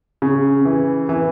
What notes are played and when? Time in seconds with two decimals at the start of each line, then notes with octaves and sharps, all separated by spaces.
0.22 C#3
0.65 E3
1.09 E3